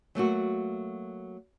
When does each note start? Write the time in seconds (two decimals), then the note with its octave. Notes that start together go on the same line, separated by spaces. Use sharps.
0.15 F#3 A3 A#3 F#4